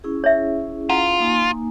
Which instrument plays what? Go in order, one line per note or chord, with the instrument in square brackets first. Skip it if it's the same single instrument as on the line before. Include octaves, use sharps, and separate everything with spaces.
[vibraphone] C#4 E4 G#4
[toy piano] C#5 E5
[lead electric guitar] F4 [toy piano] F5 F#5 A#5
[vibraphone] A#3 D#4 G#5